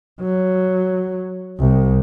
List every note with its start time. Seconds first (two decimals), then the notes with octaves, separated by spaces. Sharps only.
0.21 F#3
1.59 C2